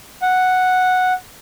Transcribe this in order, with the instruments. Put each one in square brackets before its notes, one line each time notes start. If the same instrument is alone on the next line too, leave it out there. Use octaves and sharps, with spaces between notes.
[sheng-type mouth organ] F#5